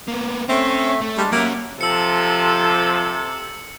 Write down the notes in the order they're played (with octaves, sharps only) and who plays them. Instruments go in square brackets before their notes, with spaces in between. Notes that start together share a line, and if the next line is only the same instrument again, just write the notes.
[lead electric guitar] A#3 B3
[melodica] A3 E5 [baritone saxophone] C4 [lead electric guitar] C#4
[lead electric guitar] A3
[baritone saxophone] G3 [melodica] G#3 D4 D5
[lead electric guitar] F#3 C#4 [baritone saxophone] A#3 [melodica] E5 F#5
[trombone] C3 [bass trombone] F3 [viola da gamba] A4 [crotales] E6 C#7